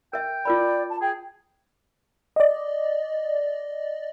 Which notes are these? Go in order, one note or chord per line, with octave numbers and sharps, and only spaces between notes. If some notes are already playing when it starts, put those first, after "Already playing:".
A#4 E5 G5
F4 A#4 D5 B5
A5
G#4 G5
D5 D#5